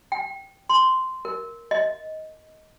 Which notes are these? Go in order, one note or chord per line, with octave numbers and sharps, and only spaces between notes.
G5
C6
A#4
D#5